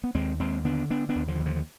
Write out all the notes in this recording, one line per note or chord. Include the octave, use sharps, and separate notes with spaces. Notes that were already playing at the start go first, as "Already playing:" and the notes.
B3
D#2 G#3 C4
D#2 G#3 C4
D3 B3 D4
D3 B3 D4
B3 D4
D#2
D3 F3
D#2
D3 F3